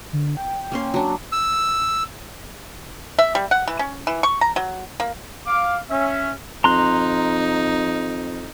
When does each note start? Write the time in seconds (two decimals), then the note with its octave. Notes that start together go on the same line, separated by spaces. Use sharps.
0.13 D3
0.37 G5
0.72 A#3 C#4 C6
0.94 F#3 D4
1.32 E6
3.19 E5
3.35 G3
3.51 F#5
3.68 E3
3.79 C#4
4.07 E3
4.23 C#6
4.41 A#5
4.56 F#3
5.00 A#3
5.46 F5 D6
5.89 C#4 E5
6.64 F2 D#4 A#5 C6 F#6